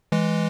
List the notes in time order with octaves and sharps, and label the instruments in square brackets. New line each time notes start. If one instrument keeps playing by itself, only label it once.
[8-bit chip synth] E3 G#3